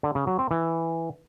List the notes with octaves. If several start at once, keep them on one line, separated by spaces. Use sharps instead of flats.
D3
C#3
F#3
C4
E3